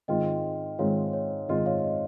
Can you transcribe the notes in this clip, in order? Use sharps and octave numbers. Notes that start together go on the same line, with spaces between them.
G#2 D#3 G#3 C4 F4 D#5 G5
G#2 D#3 G#3 C4 F4 C#5 F5
C#5
G#2 D#3 G#3 C4 F4 D#5
C#5 F5
D#5